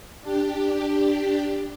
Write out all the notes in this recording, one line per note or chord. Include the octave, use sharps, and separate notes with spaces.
D4 G4